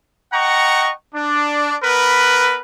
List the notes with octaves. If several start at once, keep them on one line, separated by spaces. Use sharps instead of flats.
D#5 F#5 G5 A#5 C#6
D4
B3 A#4 B4